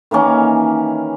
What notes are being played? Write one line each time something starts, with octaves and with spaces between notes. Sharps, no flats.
D#3 E3 A#3 C#4